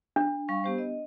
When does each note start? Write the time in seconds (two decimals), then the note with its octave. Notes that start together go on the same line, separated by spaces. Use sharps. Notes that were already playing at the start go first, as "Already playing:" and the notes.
0.16 D4
0.48 G3 F5 C#6
0.64 B3 G4 C5
0.78 D#5